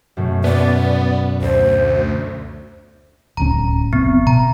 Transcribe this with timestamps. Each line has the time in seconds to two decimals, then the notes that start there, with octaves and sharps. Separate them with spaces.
0.17 F#2 B2 A3
0.44 B3 D5
1.42 D2 C5
3.37 D1 C#2 C#4 A#5
3.93 F1 C3 B3 C4
4.27 B2 A#5